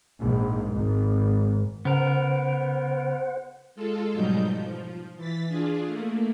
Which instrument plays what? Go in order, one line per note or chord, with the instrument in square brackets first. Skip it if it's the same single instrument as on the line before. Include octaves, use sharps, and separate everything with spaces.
[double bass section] A#1 G#2
G#1
[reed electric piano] C#3 [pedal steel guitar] B3 A#4 [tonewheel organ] C5 F#5
[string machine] G#3 F4 A4
G#2 B2 F#3 G3 D#4 G6
F3
E3 A6 B6
D4 F4 G#4
A3 A#3